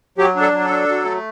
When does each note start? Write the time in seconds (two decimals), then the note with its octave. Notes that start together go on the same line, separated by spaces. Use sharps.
0.18 F#3 G4
0.36 D4
0.41 A4
0.53 F#3
0.65 A4
0.70 D4
0.88 F#3
1.05 A3